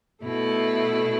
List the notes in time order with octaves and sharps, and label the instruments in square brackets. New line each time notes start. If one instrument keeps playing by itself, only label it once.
[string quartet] B2 A3 E4